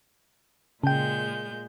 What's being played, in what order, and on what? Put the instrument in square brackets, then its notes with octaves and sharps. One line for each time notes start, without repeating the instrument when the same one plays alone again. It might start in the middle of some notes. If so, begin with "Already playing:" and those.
[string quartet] A#2 G#3 G6 [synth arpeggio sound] C#3 G5